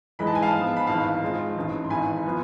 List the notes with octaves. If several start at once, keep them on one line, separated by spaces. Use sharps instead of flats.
G#2 E3 G#3 B5
A5
G#5
F5 A5
G#2 F3 B3
B5
G#1 G#2 E3 F5 A5
G#2 G#3 C4 F4
A1 G#2 E3
C6
G#1 G#2 E3 G#5 B5
F3 B3 F4